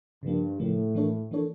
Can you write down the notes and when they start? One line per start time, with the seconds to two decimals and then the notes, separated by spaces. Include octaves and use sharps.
0.23 G2 C#3 F3 A#3
0.59 A2 C#3 F3 A#3
0.95 E3 A#3 D4 A4 C#5
1.31 E3 A#3 D4 A4 C#5